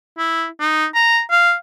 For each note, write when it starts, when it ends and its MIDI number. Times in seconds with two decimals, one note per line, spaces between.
0.18 0.47 64
0.60 0.86 63
0.95 1.21 82
1.31 1.54 77